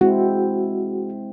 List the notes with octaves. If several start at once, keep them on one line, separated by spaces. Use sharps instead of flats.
G#3 C4 E4 F#4